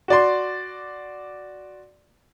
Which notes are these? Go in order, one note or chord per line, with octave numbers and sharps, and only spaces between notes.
F#4 D5 C6